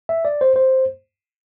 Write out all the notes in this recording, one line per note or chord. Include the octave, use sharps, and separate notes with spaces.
E5
D5
C5
C5